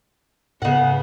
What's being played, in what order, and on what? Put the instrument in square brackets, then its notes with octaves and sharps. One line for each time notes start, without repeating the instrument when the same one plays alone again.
[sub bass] G#2 [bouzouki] C#3 F#5 [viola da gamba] B3